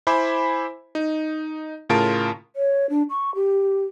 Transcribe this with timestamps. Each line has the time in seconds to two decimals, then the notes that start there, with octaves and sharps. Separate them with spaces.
0.07 E4 C5 E5 G#5 B5 D6
0.95 D#4
1.90 A2 C#3 F4 A#4 A5 D7
2.56 C#5
2.90 D4
3.10 C#6
3.35 G4